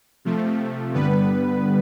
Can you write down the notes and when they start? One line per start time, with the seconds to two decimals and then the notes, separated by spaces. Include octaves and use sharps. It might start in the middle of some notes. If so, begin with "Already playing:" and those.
0.25 C3 F3 A3
0.94 G2 D3 G3 B3 B4